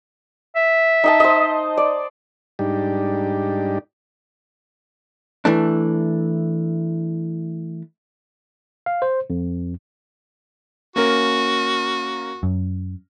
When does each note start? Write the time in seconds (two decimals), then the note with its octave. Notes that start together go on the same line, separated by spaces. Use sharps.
0.56 E5
1.04 D#4 D#5 A5
1.20 C5 D#5
1.77 D5
2.59 G#2 G3 D4 D#4 G4
5.45 E3 A3 D4
8.86 F5
9.02 C5
9.30 F2
10.96 A#3 C#4 F#4 A#4
12.43 F#2